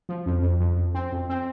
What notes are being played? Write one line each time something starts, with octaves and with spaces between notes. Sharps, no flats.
F3
F2
F2
F2
F2
C4
F2
C4